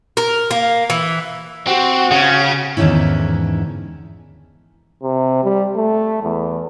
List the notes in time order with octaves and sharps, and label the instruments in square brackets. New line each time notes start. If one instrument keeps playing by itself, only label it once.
[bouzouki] A#4
A#3
E3
[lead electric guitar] C4 [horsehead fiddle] F#4
[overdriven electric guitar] C#3 [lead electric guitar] C#4
[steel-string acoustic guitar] E2 G#2 D3 D#3 C#4 E4
[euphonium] C3
G3
A3
E2